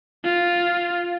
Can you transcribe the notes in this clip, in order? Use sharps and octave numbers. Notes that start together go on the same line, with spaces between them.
F4